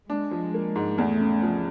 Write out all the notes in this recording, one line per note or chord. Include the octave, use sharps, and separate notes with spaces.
G#3 D4
F3
A#3
G#2
E2 A3
C#3
F3